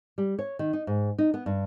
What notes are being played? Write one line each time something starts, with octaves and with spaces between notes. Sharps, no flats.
G3
C#5
D#3
D#4
G#2
D#4
B3
G2